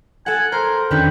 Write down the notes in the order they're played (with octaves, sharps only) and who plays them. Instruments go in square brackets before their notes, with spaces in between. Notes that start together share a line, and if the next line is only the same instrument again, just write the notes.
[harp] A4 F#5 [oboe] G#5
[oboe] A#4 [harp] C5
[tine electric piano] F2 C#4 D4 [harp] D#3 B4 [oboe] G5